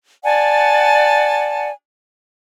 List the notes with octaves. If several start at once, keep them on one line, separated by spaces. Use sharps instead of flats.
D5 F#5 G#5 A5